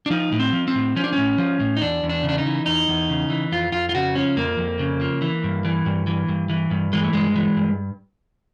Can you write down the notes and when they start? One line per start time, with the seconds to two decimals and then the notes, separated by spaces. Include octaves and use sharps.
0.06 D4
0.10 F3 D#4
0.32 A2
0.39 C4
0.53 F3
0.68 C4
0.75 A2
0.96 F3 C#4
1.04 D4
1.13 C#4
1.18 A2
1.38 F3
1.60 A2
1.76 D#4
1.81 E2 D4
2.03 E2
2.09 D4
2.23 C#3
2.29 D4
2.38 D#4
2.46 E3
2.66 E2 D#4
2.88 E2
3.10 C#3
3.30 E3
3.52 F2 F4
3.72 F2 F4
3.89 F4
3.95 C#3 F#4
4.15 F3 C#4
4.37 F2 A#3
4.58 F2
4.79 C#3
5.01 F3
5.22 E3
5.44 G2
5.65 E3
5.86 G2
6.07 E3
6.29 G2
6.49 E3
6.71 G2
6.93 E3 G#3
7.04 A3
7.13 G2 G#3
7.36 E3
7.57 G2